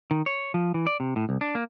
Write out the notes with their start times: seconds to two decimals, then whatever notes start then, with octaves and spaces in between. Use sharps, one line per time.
0.11 D#3
0.26 C#5
0.54 F3
0.74 E3
0.87 D5
1.00 C3
1.16 A2
1.29 C2
1.41 D4
1.55 A#3